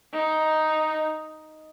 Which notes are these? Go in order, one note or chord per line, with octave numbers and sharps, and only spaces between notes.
D#4